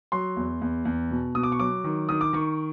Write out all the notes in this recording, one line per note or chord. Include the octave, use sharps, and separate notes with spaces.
F#3 C6
E2
E2
E2
B2
B2 D#6
D6
C#6
F#3 D6
D#3
D#3 D#6
D6
D#3 C#6